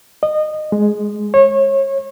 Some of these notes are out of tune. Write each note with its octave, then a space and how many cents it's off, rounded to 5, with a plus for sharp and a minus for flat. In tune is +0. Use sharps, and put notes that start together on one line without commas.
D#5 -25
G#3 +5
C#5 -30